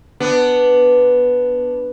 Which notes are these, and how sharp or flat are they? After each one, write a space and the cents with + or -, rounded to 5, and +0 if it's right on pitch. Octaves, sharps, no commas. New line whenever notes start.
B3 +0 D4 +0